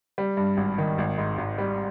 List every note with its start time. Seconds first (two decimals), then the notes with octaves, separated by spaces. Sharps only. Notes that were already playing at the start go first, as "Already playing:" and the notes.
0.18 G3
0.37 G2
0.57 G#1
0.78 D#3
0.98 G#1
1.18 G#2
1.38 G#1
1.58 G3